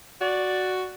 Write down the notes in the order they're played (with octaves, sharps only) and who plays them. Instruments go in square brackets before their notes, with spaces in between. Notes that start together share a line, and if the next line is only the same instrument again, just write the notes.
[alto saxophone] F#4 [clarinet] D5